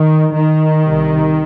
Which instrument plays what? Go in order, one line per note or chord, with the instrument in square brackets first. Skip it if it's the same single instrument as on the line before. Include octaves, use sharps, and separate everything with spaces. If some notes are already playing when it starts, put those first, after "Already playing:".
Already playing: [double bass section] D#3
D#3
C2 C3